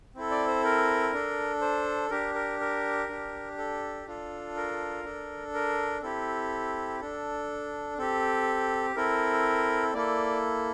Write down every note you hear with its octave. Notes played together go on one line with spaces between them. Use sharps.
C4 E4 A4
D5
C5
A#4
D4 A4
C5
D4 G4 A#4
A#4
A#4
D4 G4
A4
D4 F4 A4
A#4
D4 A4
A#4
C4 E4 G4 A4
D4 A4
C4 G4 A4
C4 E4 A4 A#4
A#3 E4 A4 D5